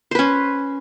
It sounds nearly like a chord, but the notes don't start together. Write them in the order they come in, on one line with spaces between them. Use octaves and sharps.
C5 B4 C#4